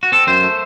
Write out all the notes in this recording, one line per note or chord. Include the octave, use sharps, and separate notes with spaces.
F#4
C4 A4
F#2 C5
A3